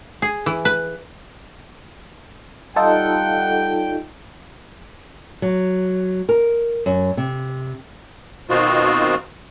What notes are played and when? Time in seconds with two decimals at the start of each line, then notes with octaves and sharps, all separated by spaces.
0.22 G#4
0.46 E3
0.65 B4
2.76 G3 D#4 F4 A4 F#5 G5
5.42 F#3
6.29 A#4
6.86 F#2
7.17 C3
8.50 B2 D#3 C4 D#4 F4 F#4